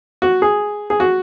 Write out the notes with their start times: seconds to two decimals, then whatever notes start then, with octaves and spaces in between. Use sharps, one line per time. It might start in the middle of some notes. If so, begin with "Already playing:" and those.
0.22 F#4
0.42 G#4
0.90 G#4
1.00 F#4